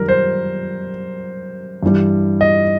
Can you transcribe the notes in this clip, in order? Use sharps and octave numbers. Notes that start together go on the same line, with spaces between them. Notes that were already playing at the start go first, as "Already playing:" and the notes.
Already playing: F#2 D#3 G3 A#4
C5
G2 E3 G3
D#5